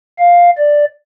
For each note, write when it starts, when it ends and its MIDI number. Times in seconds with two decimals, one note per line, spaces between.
0.19 0.50 77
0.58 0.85 74